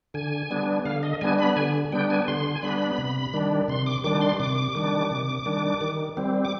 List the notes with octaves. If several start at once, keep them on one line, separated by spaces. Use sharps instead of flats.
D3 G#5
G3 B3 D4
D3 F5
D#5
G3 B3 D4 G#5
B5
D3 G#5
G3 B3 D4 G5
G#5
D3 C6
G#5
G3 B3 D4 B5
C3
D#3 G3 D4
C3 C6
D6
D#3 G3 D4 D6
C6
C3 D6
D#3 G3 D4
C3
D#3 G3 D4
D#3
G3 C4
D6